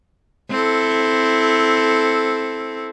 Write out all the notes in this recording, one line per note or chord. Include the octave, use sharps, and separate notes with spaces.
C4 E4 A4